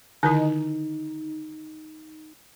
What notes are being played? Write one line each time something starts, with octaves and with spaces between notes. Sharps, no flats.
D3 D#3 D#4 E4